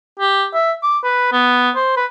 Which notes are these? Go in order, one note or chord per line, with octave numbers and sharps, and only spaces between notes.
G4
E5
D6
B4
B3
C5
B4